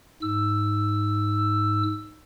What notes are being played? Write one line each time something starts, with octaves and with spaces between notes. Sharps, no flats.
G#2 E6